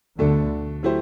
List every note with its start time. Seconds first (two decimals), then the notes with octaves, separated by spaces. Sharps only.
0.18 D2 B2 D3 A3 D4 A4
0.83 F#3 A3 E4 G4 C5